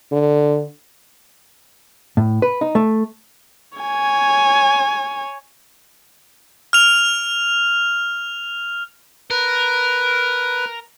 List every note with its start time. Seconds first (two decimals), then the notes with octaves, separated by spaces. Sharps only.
0.12 D3
2.17 A2
2.42 B4
2.61 D#4
2.75 A3
3.78 C#5 G#5
6.73 F6 F7
9.31 A#4 B4